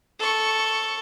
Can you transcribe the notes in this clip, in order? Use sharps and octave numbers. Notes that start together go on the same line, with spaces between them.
A4 C#6